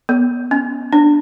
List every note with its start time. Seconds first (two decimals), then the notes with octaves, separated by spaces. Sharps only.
0.09 B3
0.51 C#4
0.93 D4